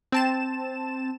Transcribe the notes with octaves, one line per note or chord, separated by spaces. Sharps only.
C4 A5 E7